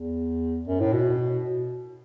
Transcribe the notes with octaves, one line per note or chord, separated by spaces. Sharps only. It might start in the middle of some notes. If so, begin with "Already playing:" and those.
Already playing: E2
F#2
A2
B2